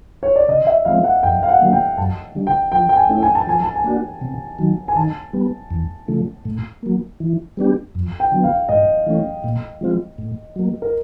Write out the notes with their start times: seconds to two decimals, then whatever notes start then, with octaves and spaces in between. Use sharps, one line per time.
0.23 C#5
0.36 D5
0.48 C#3 D#5
0.67 E5
0.85 F3 G#3 C4 F5
1.04 F#5
1.23 F2 G5
1.43 F5
1.48 F#5
1.60 D3 F#3 A#3
1.73 G5
1.98 F#2 A5
2.35 D3 G3
2.47 G5
2.72 F3 G5
2.89 G5
2.97 G#5
3.09 A3 C#4 E4
3.23 G#5
3.35 A5
3.47 F3 G#5
3.62 A5
3.76 G#5
3.84 A#3 D4 F#4
4.21 C3
4.58 D#3 F#3
4.88 G#5
4.96 D#3 A5
5.33 G3 B3
5.71 E2
6.08 C#3 F3 A3
6.45 A2
6.83 F#3 A#3
7.20 E3
7.57 G3 B3 D4 G4
7.95 F2
8.20 G5
8.32 D3 F#3 B3
8.44 F5
8.69 G#2 D#5
9.06 E3 A3 C#4
9.44 A#2
9.81 F3 G#3 C4 F4
10.18 A2
10.56 F#3 A#3
10.82 A#4